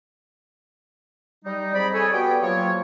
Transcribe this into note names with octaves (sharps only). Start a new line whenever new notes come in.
G3 D#4
C4 G#4 D5 D#5 B5
G#4 A4 C#5 G#5
B3 F#4 G4 D5 G5
F3 F#3 A#3 F4 C#5